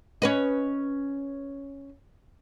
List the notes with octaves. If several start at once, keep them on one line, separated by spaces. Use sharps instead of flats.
C#4 B4 D#5